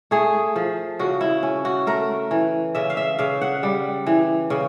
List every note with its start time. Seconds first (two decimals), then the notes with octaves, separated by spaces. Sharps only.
0.11 A3 G#4
0.56 F3
0.99 C#3 F#4
1.21 E4
1.43 C#4
1.65 F#4
1.87 A3 A#4
2.31 E3
2.75 C#3 E5
2.90 F5
2.97 E5
3.19 C#3 F5
3.42 F#5
3.63 G3
4.07 E3
4.50 C#3